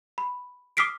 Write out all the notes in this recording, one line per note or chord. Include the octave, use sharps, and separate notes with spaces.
B5
D6 D#6 F6 B6 C7 D7